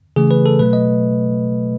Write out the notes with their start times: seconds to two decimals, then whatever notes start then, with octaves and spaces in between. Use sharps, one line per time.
0.16 C#3 E3 A3 G#4
0.31 B4
0.46 A4
0.59 B2 F#3 A3 B4
0.73 D#5